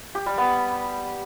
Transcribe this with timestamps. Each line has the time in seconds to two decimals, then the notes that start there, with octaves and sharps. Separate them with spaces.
0.15 G4
0.26 G3
0.38 B3